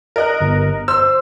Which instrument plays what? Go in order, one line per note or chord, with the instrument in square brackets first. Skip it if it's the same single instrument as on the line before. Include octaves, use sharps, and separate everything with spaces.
[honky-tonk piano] A#4 D#5 F#6
[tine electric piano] G1
[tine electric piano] C5 [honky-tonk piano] E6